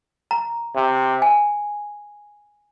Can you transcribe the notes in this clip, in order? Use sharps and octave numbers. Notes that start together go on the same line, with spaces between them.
A#5
C3
G#5